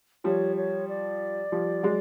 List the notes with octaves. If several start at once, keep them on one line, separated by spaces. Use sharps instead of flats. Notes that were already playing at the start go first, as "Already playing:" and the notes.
F3 G3 C#5
C#5
D5
F3 G3
F#3 G#3